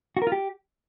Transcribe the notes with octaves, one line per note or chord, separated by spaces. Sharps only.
F#4
A#4
F4
G4